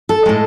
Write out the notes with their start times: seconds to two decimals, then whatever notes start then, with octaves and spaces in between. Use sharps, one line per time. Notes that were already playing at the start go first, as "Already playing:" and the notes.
0.09 A4
0.26 A2 G#3